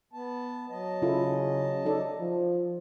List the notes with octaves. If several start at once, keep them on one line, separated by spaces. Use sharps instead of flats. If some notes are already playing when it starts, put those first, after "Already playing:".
B3 A5
F#3 D#5 A5
C#3 E4 F4 A4
D#4 A4 D5
F3